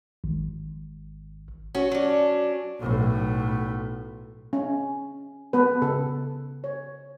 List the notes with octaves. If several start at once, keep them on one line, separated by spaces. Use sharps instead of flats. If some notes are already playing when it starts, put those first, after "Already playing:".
G#1
C#4 F#4
F#3 D4
B1 A2
C#4
B3 B4
C#3 A4
C#5